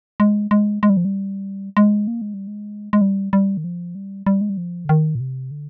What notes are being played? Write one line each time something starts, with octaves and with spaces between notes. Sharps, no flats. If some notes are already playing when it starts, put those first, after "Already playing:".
G#3
G#3
G#3
G3
F3
G3
G#3
A#3
G#3
G3
G#3
G#3
G3
G3
D#3
F3
G3
G3
G#3
G3
F3
D3
D#3
A#2
C3
D3